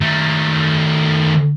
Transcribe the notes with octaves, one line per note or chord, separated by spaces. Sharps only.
D#3 A3